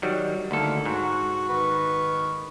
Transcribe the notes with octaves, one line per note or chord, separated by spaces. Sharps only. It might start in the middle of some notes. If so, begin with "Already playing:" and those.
D#3 F#3 G3
D2 D#3 A#3 A4
G#2 F#4
D#3 B4 C#6